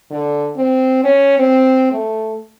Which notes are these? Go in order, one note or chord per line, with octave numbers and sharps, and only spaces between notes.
D3
C4
C#4
C4
A3